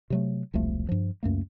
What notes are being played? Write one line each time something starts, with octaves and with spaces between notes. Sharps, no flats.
C3 F#3 A3
E1 C2 F3 A3
G2 F3
C#2 F#2 A3 A#3